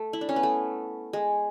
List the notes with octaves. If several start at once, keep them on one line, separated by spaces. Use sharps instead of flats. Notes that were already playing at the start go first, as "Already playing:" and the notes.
Already playing: A3
E4
D4
C#4
B3
A3
G#3